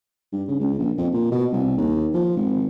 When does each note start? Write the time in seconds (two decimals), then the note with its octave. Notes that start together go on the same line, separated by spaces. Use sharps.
0.33 G2
0.48 C#3
0.60 C#2
0.79 A#1
0.98 F2
1.13 A#2
1.32 B2
1.53 C2
1.77 D#2
2.14 F3
2.37 G#1